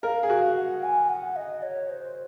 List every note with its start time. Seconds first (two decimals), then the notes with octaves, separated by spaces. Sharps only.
0.03 A#4 F5
0.23 G#4
0.30 F#4
0.56 F#5
0.83 G#5
1.09 F#5
1.36 D#5
1.63 C#5
1.89 C5